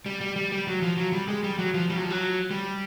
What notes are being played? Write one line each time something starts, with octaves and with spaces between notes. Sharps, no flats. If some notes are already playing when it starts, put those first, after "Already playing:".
G3
G3
G3
G3
F#3
F3
F#3
G3
G#3
G3
F#3
F3
G3
F#3
F3
F#3
G3